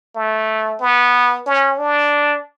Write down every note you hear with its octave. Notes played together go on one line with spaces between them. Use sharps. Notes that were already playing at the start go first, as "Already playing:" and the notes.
A3
B3
C#4
D4